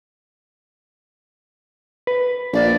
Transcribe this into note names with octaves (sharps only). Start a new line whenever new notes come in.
B4
A#1 D5